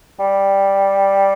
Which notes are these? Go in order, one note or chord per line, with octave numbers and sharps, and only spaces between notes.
G3